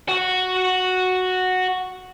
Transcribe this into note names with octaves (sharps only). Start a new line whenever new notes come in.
F#4 F#5